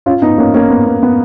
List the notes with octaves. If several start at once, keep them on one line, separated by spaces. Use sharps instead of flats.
C#4 F4
B3 D#4
A#3 C#4
A#3 C#4
B3
B3
B3